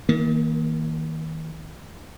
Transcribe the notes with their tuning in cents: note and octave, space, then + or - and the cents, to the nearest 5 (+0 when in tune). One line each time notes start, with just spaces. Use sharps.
D#3 +40 A#3 +0